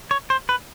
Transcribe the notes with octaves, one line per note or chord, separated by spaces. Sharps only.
C#5
C5
B4